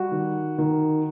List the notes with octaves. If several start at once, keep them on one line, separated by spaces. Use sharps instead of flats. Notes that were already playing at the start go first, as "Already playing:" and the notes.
Already playing: G3 F#4
D#3
D#3